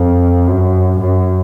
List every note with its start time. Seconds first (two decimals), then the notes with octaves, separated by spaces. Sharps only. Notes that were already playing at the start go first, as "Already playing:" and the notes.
Already playing: F2
0.47 F#2
1.00 F#2